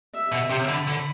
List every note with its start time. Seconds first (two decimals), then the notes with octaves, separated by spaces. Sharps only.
0.14 E5
0.32 B2
0.50 C3
0.68 D3 B5
0.87 D3